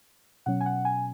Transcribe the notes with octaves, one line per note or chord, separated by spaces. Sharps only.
B2 F#3 C#4 F#5
G#5
F#5
G#5